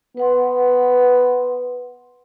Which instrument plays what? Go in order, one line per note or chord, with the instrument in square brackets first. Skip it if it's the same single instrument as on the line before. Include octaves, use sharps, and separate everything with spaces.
[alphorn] B3 [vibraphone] B4 F#5 C6